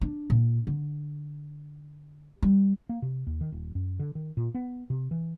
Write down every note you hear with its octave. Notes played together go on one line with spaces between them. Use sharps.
D4
A#2
D3
G3
A#3
C3
D#2
D#3
D#1
F#2
D3
D#3
A#2
B3
C3
E3